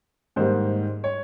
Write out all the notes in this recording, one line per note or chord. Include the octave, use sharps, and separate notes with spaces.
G#2 D#3 G3 A#3 C5
C#5